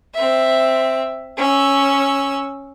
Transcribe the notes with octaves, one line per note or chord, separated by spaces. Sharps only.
C4 E5
C#4 E6